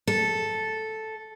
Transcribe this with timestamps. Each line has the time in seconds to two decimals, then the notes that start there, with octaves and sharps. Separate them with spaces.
0.07 A4